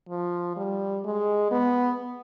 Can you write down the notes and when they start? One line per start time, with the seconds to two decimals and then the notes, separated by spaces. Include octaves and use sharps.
0.09 F3
0.56 G3
1.04 G#3
1.51 B3